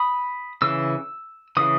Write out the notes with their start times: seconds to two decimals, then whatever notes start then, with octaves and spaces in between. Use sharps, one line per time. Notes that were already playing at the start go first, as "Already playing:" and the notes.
Already playing: B5 D#6
0.62 C#3 E3 E6
1.57 C#3 E3 D#6